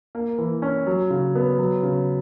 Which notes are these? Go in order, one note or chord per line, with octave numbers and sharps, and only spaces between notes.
A#3
E3
C#4
F#3
C#3
B3
F#3
C#3